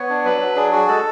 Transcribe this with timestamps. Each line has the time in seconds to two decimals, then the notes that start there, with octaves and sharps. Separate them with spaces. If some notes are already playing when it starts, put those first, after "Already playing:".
Already playing: B3 C#5
0.09 D4
0.25 F#3 B4
0.41 F#3
0.56 D4 G#4
0.72 F#4 G#4
0.88 G#3 A4